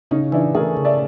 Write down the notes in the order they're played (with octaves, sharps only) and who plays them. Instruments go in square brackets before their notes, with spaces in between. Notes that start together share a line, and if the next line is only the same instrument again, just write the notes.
[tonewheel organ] C#3 [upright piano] C#4 D#4
[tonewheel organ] E3 [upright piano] D4 E4
[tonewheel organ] A3 [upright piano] G#4 A#4
[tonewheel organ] C#3
[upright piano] D5 E5